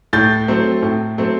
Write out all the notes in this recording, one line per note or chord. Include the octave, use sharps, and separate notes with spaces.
A2 G6 A6
F#3 A3 C4
A2
F#3 A3 C4